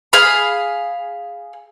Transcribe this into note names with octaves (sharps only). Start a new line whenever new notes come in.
G#4 F5 B5